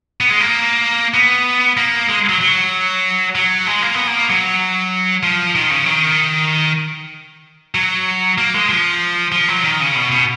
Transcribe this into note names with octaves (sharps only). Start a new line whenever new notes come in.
B3
G#3
A#3
B3
A#3
G#3
F#3
F#3
F#3
G#3
A#3
B3
A#3
F#3
F3
D#3
C#3
D#3
F#3
A#3
G#3
F3
F3
F#3
D#3
C#3
B2
B2